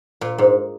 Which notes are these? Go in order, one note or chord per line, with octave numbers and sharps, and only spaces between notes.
A#2
G#2